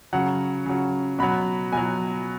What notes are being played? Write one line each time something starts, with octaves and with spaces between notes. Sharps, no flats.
C#3 F#3 F#5
C#3 F#3
B2 F#3 B5
B2 F#3 G#5